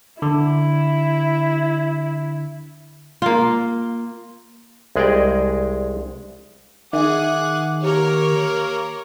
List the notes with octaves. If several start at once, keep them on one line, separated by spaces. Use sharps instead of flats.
D3 E4
A#3 F4
C2 G#3 G#4 D5 D#5 G5
D#3 G#4 E5 F#5 D6
A#3 G4 A#4 C#5